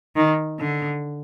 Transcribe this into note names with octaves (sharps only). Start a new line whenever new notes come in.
D#3
D3